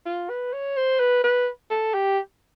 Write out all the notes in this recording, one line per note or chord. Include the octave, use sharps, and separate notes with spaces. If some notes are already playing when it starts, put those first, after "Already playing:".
F4
B4
C#5
C5
B4
B4
A4
G4